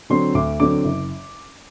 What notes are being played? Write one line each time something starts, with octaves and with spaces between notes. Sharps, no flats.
D3 F#3 C4 C6
D2 D6
D3 F#3 C4 D6
F#1